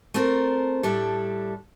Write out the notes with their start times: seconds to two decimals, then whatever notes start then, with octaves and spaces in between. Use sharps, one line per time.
0.14 A3 C4 F4 A#4
0.83 A2 G3 D4 A4